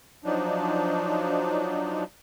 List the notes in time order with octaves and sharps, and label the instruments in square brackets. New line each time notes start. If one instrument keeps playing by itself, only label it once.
[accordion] F3 F#3 D4 D#4